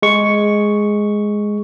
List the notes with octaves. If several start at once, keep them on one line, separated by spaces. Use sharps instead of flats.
G#3 C#6